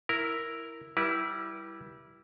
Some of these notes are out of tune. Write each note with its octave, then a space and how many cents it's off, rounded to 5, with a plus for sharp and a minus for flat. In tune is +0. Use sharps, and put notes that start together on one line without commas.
E4 +0 A#4 +0
G3 -10 E4 +0 B4 -40